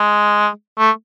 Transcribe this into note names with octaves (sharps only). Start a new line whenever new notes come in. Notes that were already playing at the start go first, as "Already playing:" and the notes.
Already playing: G#3
A3